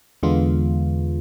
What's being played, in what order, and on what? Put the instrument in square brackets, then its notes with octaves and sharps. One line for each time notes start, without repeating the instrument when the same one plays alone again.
[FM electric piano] E2 D3 G#3 B3 F4